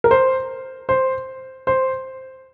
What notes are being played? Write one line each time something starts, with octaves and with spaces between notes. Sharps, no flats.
A#4
C5
C5
C5